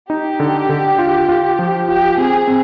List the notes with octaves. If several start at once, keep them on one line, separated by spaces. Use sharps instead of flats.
D#4 G4
D3
D3
F4
F4
F3
F4 G4
C4 G#4
C4